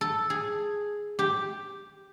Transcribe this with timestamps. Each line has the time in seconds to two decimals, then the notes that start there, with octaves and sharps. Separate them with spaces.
0.01 A4
0.30 G#4
1.19 G4